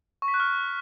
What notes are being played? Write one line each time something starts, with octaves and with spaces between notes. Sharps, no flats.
C#6
B6
F#6
F6